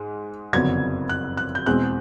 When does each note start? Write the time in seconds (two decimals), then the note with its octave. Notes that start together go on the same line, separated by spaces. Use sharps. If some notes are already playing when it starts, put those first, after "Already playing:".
Already playing: G#2 G#3
0.53 F#1 F2 D3 F#3 B3 G#6
1.09 F#6
1.37 F#6
1.55 G6
1.66 E2 B2 G#3 C4 F#6